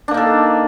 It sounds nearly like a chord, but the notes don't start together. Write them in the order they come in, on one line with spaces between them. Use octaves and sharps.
D4 A#3 D#4 A4